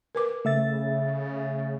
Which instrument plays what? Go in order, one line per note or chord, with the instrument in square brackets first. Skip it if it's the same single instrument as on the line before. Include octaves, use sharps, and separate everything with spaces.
[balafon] A#4 B4 D6
[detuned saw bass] C#3 [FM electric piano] A3 E5 A6